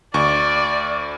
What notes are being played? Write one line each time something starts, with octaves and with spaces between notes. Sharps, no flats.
D2 D5 C#6